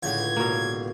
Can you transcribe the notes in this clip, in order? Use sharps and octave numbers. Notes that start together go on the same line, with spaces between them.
C#2 A2 D3 G#6
B2 A#3